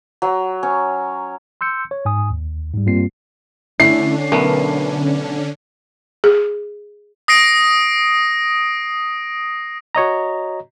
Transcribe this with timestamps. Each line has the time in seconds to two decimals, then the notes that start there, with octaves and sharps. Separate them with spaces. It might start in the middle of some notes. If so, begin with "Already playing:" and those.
0.22 F#3
0.63 C#4
1.61 C6 E6 G6 C#7
1.91 C#5
2.05 G#2 G#5 D#6
2.30 D#2
2.74 G#2 G3
2.86 G2 G3 A#3 C4 F4 C7
3.80 D3 A3 C#4 D4 E4 C7
4.32 B1 A3 B3 A#4 B4
6.24 G#4
7.28 D#6 A#6 C7 D7
9.95 F#4 C#5 D#5 A#5